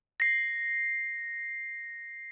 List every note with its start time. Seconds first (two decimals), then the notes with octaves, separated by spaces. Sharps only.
0.20 A#6 C7